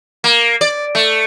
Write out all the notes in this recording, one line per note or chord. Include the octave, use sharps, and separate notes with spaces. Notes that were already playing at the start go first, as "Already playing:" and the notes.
A#3
D5
A3